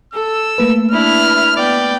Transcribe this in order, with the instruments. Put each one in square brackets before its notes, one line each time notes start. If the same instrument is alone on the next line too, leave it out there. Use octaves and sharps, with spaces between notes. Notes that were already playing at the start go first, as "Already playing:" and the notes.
[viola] A4 [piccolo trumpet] E6
[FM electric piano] A3 A#3 B4
[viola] D4 E4 [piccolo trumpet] F6
[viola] B3 G5 [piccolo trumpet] D5